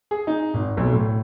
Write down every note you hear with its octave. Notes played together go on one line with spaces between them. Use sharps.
G#4
D#4
G#1
B1
A2